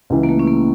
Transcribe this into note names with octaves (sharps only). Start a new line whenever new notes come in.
C#2 C#3 E3
A#3
A3
C#4
A#3